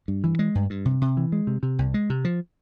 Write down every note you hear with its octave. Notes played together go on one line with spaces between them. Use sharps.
G2
E3
G#3
G2
G2
C3
C3
E3
G#3
C3
C3
C2
G#3
C3
F3